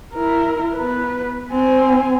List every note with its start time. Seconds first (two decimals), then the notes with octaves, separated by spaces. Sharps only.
0.15 E4 A#4
0.74 B3 B4
1.52 C4 G#5